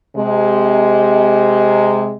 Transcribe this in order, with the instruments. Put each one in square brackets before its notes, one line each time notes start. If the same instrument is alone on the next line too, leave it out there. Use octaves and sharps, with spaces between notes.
[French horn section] C3 G#3